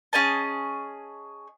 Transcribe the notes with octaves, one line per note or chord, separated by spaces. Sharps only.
C#4 G#4 D#5 A5